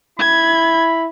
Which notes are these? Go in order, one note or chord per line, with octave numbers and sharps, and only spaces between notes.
E4 B5 G#6